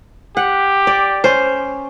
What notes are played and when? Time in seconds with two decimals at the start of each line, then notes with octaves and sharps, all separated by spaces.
0.37 G4 F#5
0.87 D5
1.24 C#4 C5